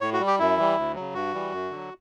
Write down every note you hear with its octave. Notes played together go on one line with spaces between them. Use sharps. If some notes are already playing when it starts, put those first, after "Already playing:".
A2 C#5
F#4
G3
G4
F#2 E4
E3 G3
D2
C#3 F#3
G2 F#4
E3 G3
F#2
D3 F#3